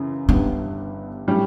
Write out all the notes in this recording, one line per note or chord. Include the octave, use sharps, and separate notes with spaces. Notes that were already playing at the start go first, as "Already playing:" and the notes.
Already playing: F#2 C#3 E3
G1 G2 D3 G3 B3
A2 G3 C#4 G4